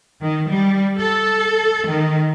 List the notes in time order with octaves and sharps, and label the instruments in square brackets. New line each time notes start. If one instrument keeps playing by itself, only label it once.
[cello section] D#3
G3
A4
D#3